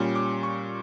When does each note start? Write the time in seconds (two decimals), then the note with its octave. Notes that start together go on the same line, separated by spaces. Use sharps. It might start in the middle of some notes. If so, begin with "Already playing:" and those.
Already playing: A#2 G3 C#4
0.15 D6
0.43 C#6